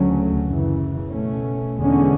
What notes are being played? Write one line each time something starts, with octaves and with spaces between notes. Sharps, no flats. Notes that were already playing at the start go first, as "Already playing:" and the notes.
Already playing: D2 C#3 F#3 A3 C#4
F#2 C#3 E3
B2 A3 C#4
E2 D3 G#3 C#4